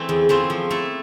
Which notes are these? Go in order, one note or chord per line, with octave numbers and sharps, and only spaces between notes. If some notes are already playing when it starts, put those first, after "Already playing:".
Already playing: E3 A3 C4
E2
E3 A3 C4 F4
F3
A3 E4 A4